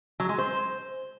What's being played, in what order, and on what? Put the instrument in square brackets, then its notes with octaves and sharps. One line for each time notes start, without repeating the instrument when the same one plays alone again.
[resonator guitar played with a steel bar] F#3
G#3
C5